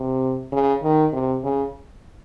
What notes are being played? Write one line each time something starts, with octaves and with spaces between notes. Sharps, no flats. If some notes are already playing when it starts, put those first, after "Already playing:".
Already playing: C3
C#3
D#3
C3
C#3